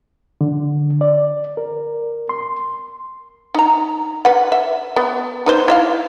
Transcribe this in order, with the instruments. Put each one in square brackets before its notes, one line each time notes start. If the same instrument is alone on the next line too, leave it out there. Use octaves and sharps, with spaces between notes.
[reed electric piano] D3
D5
A#4
C6
[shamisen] D#4 A#5
B4 F#5
E5
B3
D#4 B4 C5
E4 E5 F5